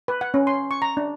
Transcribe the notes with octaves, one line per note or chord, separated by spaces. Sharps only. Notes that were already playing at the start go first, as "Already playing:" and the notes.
B4
F#5
C#4
C6
C#6
A#5
D4